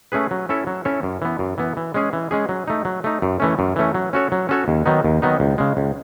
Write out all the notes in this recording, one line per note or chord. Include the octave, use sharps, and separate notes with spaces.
A3 C#4 G#4 B4
F#3
C#4 E4 A4 C#5
F#3
C#4 E4 A4 C#5
F#2
E3 B3
F#2
E3 B3
E3
G#3 C#4 G#4
E3
G#3 C#4 G#4
F#3
A3 D#4
F#3
A3 D#4
F#2
E3 A3 C#4
F#2
E3 A3 C#4
F#3
C#4 F#4 A4 C#5
F#3
C#4 F#4 A4 C#5
D#2
D#3 F#3 B3 D#4
D#2
D#3 F#3 B3 D#4
C#2
C#3 G#3
C#2